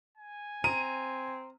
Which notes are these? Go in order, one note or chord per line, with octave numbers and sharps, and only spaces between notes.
G#5
C4 A#5 D#7